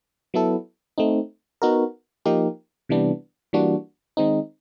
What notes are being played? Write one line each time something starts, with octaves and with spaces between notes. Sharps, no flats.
F#3 B3 E4 A4
A3 C4 D#4
B3 D#4 F#4 A#4
F3 A#3 D#4 G4 A#4
C3 E3 G3 B3 D4
E3 G3 A#3 D4 F#4
D#3 G#3 C4 D#4